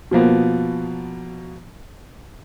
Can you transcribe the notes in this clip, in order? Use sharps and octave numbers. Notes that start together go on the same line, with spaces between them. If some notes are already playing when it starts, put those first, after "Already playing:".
B2 F3 A#3 B3